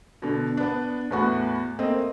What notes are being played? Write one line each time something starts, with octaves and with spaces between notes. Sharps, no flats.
B2 D3
B3 D4
E2 A2 B3 F#4
A3 A#3 C4 D#5